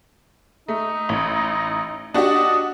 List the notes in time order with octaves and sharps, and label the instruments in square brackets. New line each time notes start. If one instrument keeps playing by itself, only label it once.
[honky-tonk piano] A3 [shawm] D#4
[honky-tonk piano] A1
[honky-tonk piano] D4 F#4 G4 [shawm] D#5